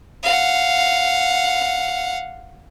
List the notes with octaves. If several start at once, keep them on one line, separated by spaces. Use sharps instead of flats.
F5 F#5